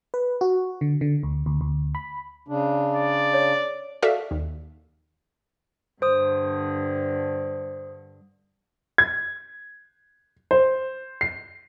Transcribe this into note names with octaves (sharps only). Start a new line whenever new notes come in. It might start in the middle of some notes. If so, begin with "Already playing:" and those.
B4
F#4
D3
D3
D2
D2
D2
B5
C#3 D4
D5
C#5
F#4 A4 D5 E5 F5
D#2
G2 D3 C5 D#6
G#6
C5
C7